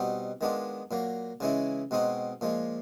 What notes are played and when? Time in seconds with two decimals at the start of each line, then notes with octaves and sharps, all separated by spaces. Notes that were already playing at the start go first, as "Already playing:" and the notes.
Already playing: B2 G3 C4 D#4 F#4
0.41 D#3 G#3 B3 D4 F4
0.91 A#2 F#3 A#3
1.40 C#3 E3 G#3 C#4 E4
1.91 B2 G#3 C4 D#4 F#4
2.41 A#2 F3 G#3